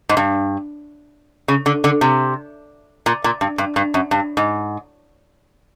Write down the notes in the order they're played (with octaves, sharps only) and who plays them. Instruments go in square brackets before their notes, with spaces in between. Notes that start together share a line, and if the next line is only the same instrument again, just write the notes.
[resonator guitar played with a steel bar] G#2
G2
C#3
D3
D3
C3
A#2
A#2
G2
G2
G2
F#2
G2
G#2